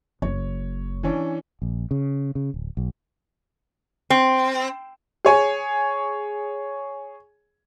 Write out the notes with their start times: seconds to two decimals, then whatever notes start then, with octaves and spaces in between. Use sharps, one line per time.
0.22 F#1 C#5
1.03 E3 C#4 D4
1.62 A#1
1.91 C#3
2.35 C#3
2.54 D1
2.77 B1
4.10 C4
5.25 G#4 C#5 G#5